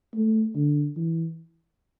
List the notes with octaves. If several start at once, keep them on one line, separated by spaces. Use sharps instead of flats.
A3
D3
E3